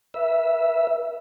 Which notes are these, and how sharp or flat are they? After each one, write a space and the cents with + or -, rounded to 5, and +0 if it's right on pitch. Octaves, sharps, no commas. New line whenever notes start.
B4 -35 E5 +0 E6 +0